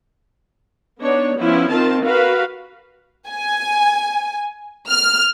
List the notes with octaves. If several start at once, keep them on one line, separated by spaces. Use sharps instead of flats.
B3 D4 D#4 C#5
F3 B3 C#4 E4
D#3 C4 F4 A5
F#4 A#4 B4 F5
G#5
F6